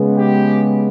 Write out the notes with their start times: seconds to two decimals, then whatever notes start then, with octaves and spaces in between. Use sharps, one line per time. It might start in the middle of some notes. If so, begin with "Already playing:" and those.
Already playing: C#3 G#3 B3
0.18 G4